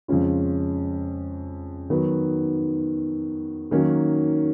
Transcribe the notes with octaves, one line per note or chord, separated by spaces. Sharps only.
F2 C#3 G#3 C#4 F4
D#3 F#3 B3
D#3 F#3 A#3 C#4